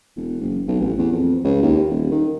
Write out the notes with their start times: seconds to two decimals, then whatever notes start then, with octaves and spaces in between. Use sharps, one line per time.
0.16 E1
0.41 F#1
0.68 B1
0.80 A1
0.98 E2
1.12 F2
1.44 C#2
1.63 D#2
1.90 D#1
2.11 D#3